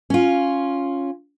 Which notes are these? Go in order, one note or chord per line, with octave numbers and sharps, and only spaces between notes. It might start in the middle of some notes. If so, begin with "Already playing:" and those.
C#4 F4